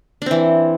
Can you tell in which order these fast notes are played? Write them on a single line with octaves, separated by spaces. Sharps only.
D4 C4 E3